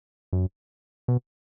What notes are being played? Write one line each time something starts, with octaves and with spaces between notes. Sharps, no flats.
F#2
B2